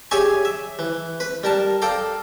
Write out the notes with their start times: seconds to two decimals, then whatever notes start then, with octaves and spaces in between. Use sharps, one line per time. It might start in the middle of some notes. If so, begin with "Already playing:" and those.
0.11 G4 G#4 C#5 D5 E5 G#5
0.45 E5
0.79 E3
1.20 B4 B5
1.44 G3 A#4 A5
1.82 A4 D5 F5 G5 A#5